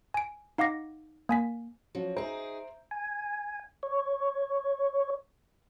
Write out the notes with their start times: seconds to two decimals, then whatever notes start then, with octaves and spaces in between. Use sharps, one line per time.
0.14 G#5 D7
0.58 D#4 F5 F#5 D6 A#6
1.29 A#3 G#5 B6
1.95 F3 F#3 C#4 F#4
2.17 D#4 G#4 C5 E5 A#5 D7
2.91 G#5
3.83 C#5